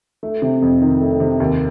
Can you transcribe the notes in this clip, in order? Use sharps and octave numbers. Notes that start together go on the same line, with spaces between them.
A3
C3
F2
D#3
A3
C3
D#2